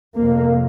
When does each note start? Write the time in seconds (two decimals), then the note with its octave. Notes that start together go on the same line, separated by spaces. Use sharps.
0.16 F2 C3 A#3